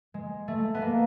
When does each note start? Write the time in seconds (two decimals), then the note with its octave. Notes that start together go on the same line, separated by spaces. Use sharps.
0.14 G#3
0.48 A3
0.74 B3
0.82 A#3